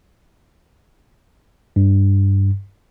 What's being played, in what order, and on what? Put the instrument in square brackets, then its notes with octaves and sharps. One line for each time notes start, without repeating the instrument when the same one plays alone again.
[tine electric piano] G2